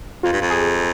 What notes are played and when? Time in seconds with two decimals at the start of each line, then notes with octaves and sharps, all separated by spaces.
0.23 F2 F4
0.32 G2
0.41 F2
0.50 G#4